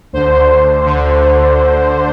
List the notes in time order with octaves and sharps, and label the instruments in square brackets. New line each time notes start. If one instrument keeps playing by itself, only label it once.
[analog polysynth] D2 D3 C5
D2 D3